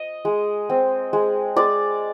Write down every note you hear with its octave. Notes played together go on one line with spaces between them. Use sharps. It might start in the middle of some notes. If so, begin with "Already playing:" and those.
Already playing: D#5
G#3
C4
G#3
G#3 D5